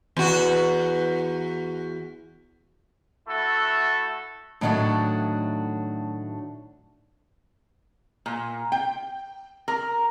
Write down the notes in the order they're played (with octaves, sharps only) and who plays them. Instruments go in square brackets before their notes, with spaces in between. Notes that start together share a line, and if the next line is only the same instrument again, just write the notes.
[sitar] E2 F#4
[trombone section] A3 E4 F#4 A4
[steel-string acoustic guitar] A2 D#3 F#3 A3 D4 F#4
[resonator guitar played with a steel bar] A#2
G5
A#4